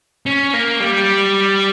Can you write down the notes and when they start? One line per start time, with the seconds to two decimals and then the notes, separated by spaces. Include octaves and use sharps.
0.26 C#4
0.53 A#3
0.80 G3